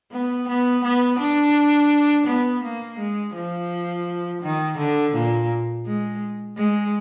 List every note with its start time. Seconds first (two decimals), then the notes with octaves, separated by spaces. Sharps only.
0.12 B3
0.48 B3
0.84 B3
1.19 D4
2.27 B3
2.63 A#3
2.98 G#3
3.35 F3
4.42 D#3
4.78 D3
5.14 A#2
5.86 G#3
6.57 G#3